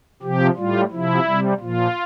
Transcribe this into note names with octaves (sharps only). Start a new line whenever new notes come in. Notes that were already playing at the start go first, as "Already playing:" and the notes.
C3 F3 G4
A2 G3 F4
C3 F3 E4
C3 G3
A#2 F3 F4